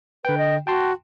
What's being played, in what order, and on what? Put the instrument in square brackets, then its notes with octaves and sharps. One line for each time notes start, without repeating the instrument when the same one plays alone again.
[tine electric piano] D3 G5 [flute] B4
[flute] D#5
[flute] F#4 [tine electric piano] G5 A5 C6